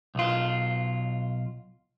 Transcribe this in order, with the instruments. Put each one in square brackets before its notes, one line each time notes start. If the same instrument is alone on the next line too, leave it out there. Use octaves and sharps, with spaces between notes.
[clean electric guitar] B1 F4